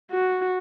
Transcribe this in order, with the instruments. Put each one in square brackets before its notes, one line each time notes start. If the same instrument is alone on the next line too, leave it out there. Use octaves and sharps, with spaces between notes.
[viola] F#4